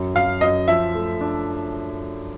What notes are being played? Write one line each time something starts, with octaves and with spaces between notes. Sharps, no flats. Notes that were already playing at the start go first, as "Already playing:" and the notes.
Already playing: F#2
F#2 F5
F#2 D#5
F3 E5
A3
D4